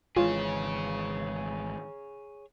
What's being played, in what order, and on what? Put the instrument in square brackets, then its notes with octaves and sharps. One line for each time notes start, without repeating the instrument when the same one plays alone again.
[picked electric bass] G#1 E3 G#3 [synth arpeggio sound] F4 [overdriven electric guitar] G#4 C#5